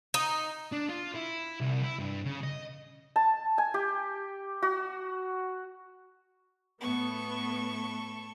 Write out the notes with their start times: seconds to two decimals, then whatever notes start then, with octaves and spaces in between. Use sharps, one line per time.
0.14 D#4
0.72 D4
0.89 F4
1.15 E4
1.60 C2
1.83 E4
1.99 G2
2.25 C#3
2.43 D#5
3.16 A5
3.58 G#5
3.74 G4
4.62 F#4
6.81 A2 B3 A4 C#6